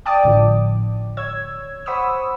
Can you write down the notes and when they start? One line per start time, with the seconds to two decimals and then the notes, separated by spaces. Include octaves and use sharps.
0.05 D5 G5 A5 D6 D#6
0.24 G#1 A2 D3 F3
1.17 C#5 E6 G#6
1.86 C5 F#5 B5 C#6 D#6 E6